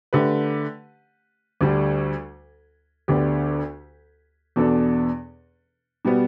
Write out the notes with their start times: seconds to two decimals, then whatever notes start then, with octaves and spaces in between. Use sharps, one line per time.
0.13 D3 A3 G4 B4
1.61 D2 D3 G3 D4
3.08 D2 D3 B3 D4 G4
4.56 E2 B2 B3 D4 A4
6.05 B2 G3 B3